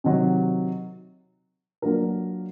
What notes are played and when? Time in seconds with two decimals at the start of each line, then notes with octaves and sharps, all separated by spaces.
0.04 C3 D#3 F#3
1.82 F#3 A#3 D4 F4 A#4